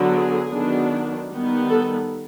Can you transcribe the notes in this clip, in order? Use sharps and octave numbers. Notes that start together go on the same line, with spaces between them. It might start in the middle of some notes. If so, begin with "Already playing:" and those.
Already playing: D3 F#3 B3
G#4
D#3 F#3 B3 D4
D#3 G3 B3
A4